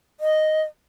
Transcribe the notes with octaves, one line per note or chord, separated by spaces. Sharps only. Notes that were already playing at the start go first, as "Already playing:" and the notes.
D#5